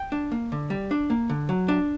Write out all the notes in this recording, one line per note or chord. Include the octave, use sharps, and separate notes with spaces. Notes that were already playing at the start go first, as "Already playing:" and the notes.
Already playing: G5
D4
A#3
D3
G3
D4
A#3
D3
F#3
D4